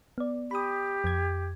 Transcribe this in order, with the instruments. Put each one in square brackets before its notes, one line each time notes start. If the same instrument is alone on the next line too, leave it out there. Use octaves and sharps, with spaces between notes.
[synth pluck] B3 D5
[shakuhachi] G4 [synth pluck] B5 D#6
[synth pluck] F2 G#6